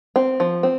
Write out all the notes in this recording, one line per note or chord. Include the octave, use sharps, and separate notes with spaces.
C4
F3
C4